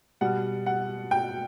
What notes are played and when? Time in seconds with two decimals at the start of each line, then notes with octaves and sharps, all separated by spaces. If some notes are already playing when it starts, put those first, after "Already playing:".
0.21 B2 G3 F#5
0.66 F#5
1.11 G5